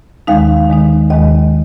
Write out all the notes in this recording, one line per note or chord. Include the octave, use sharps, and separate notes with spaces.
D#2 D#3 G#3 D#4 F5
D#2 D#3 G#3 D#4
D#2 D#3 G#3 D#5